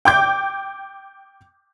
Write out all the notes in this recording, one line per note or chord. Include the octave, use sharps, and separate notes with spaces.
G5 D6 G6